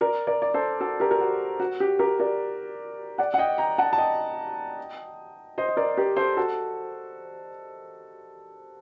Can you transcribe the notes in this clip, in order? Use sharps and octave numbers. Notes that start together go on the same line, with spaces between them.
A#4 D5
A#4 D5
D5
A4 C5
F#4 A4
G4 A#4
A#4
F#4 A4
F#4
G4
G4 A#4
A#4 D5
D5 F#5
F#5
D#5 G5
G5 A#5
F#5 A5
A5
D#5 G5
C5 D#5
D#5
A#4 D5
G4 A#4
A4 C5
F#4 A4